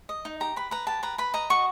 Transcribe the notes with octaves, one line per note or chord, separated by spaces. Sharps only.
D#5
D#4
G4 A#5
B4 B5
B4 A#5
G4 A5
B4 A#5
B4 B5
D#5 A#5
F#4 C#6